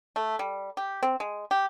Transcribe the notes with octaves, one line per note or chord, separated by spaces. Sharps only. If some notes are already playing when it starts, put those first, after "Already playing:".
A3
G3
G4
C4
G#3
G4